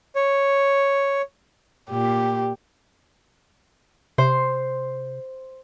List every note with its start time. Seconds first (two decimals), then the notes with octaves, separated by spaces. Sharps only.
0.16 C#5
1.90 A#2 G4
4.18 C3 C5